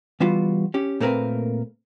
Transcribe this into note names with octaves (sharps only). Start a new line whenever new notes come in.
E3 G3 B3 F4 F#4
C#4 G4
A#2 A3 A#3 C4 A#4 B4